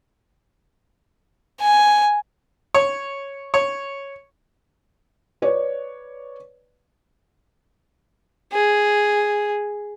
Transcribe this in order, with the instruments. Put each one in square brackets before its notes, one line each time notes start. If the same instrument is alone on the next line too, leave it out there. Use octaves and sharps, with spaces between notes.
[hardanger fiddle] G#5
[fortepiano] C#5
C#5
[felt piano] B4 C#5 D5
[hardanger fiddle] G#4